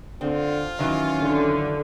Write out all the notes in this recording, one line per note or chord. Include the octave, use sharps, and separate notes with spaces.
D3 C4 F4
D#3 E3 F#3 C#4
D3